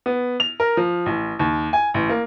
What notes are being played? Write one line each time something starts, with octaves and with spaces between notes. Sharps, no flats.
B3
F7
A#4
F3
A1
D#2
G#5
A1
A#3